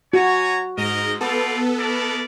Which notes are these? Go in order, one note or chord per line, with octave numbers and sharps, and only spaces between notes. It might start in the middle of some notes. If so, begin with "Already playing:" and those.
F#4 C#5 G#5 A#5
G#2 A#4 D#5 A#5
B3 D#4 F4 A4 D5
E4 A#4 D5